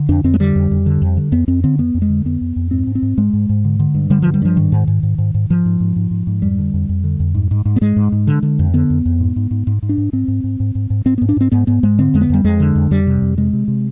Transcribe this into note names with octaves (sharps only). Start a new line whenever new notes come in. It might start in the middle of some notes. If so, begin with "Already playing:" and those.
Already playing: D3
F2 D4
F2 C4
G#3
D3 G3
F2
F2
D3
F2
D3
F2 B3
F2 C4
D3 C4
F2 B3
F2
G#3
D3
F2 B3
F2
F2
G#2 C4
G#2
C4
G#2
G#2 G#3
G#2
G#2
D3
D3
G2
D3 G3
G2 F3
G3
G2 F3
G#2 D#3
G#2
G#2
G#2
G#2
G#2
G#2 F3
G#2
G#2
G#2
G#2
G#2
F2 G3
D3
F2
F2
D3
F2
G#2
G#2
G#2
B3
G#2 G#3
G#2
G#2
D3
D3
F2
D3 B3
F2
F2
G#2
G#2
G#2
G#2
G#2
D4
G#2
G#2 C4
G#2
G#2
G#2
G#2
G#2
G#2 C4
G#2 B3
D4
G#2 C4
G#2 B3
G#2 B3
G#2 G#3
D3 C4
F2 G#3
B3
F2 G3
F2 G#3
D3
F2
F2 G3
C3
F2
C3 G#3
C3
C3